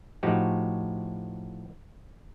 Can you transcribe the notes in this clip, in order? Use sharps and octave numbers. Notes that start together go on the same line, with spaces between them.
A2 F3 D#4 F#4 G4